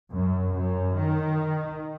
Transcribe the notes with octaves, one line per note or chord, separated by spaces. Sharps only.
F#2
F#2
D#3